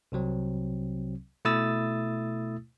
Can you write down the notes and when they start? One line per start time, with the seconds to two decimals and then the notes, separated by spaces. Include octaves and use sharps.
0.12 C2 C3 F#3 C4
1.45 B2 A3 E4 D#6 E6 A6